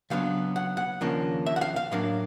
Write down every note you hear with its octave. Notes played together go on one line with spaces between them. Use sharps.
C#3 F#3 B3 D4 F5
F#5
F#5
D#2 C#3 F3 A#3 D4
E5
F#5
F5
F5
A2 F#3 A#3 D4 F5